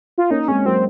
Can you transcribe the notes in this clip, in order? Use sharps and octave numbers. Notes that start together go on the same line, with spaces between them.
F4
A#3 C#4 D#4
G#3 C4 C#4
F#3 A#3 C4